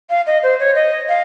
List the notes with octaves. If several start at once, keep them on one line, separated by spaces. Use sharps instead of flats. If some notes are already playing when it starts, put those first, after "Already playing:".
F5
D#5
C5
C#5
D#5
F5